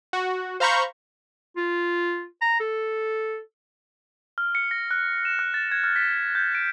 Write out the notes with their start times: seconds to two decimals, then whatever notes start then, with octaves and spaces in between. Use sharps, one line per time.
0.13 F#4
0.60 C5 F5 A#5 B5 C#6 G6
1.57 F4
2.41 A#5
2.60 A4
4.38 F6
4.55 C#7
4.71 A#6
4.91 F#6
5.25 E7
5.39 F#6
5.54 A6
5.72 G#6
5.84 F6
5.96 B6
6.35 G6
6.55 D7